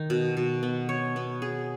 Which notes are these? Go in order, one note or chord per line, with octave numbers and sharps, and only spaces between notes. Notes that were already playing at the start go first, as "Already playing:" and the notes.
Already playing: D#3 D#4
B2
B2
B3
C#5
B3
G#4